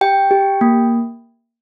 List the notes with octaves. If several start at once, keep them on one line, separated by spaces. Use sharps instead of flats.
G4 G5
G4
A#3